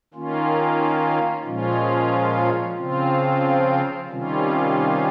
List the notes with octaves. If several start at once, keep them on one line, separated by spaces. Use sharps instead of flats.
D#3 A#3 C#4 F4
A#2 F3 G#3 C#4 F4
C#3 F3 C4 F4
C3 D#3 G3 C#4 F4